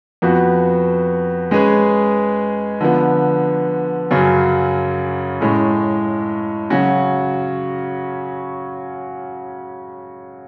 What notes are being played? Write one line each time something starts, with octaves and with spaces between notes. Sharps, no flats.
F2 F3 B3 F#4 B4
G#3 C#4 G#4 B4
D3 F3 B3
F#2 C#3 F#3
A2 G#3 C#4
C#3 F#3 C#4 F#4